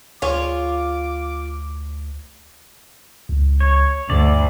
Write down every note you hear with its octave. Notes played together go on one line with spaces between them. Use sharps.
D2 F4 G#4 C#5 D6
C#2
C#5
D2 G2 D5